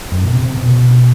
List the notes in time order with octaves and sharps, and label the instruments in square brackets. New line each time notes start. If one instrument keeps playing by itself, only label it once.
[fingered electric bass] F#2
B2
C3
C3
B2